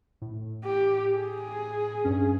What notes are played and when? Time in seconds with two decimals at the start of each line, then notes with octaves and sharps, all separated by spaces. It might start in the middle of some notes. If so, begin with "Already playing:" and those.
0.22 A2
0.64 G4
1.16 G#4
2.04 G2 C#4